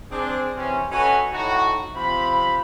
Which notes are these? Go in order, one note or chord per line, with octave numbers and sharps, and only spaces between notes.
C4 D4 G#4
C3 E3 C4 C#4
C#4 F#4 A4 B4 D#5 G#5
A2 D#4 F#4
C3 F3 C4 B5